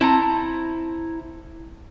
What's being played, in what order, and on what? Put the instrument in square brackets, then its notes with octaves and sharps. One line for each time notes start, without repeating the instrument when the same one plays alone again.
[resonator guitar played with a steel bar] C4 A5 [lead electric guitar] E4 A#5